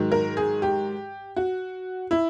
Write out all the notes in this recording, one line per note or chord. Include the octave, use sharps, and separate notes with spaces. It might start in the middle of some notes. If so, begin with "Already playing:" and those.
Already playing: G#2 D#3 F#3
A#4
G#4
G4
F#4
E4